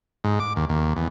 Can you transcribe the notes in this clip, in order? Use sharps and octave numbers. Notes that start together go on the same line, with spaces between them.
G#2
D6
D#2
D#2
E2